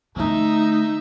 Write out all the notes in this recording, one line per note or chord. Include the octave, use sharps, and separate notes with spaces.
D3 A3 D#4 E5